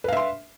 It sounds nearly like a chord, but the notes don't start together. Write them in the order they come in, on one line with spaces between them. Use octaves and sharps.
B4 F5 E5 C6